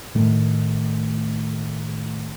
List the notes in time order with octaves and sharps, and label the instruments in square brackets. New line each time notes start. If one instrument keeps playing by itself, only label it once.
[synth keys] A2 D#3 A3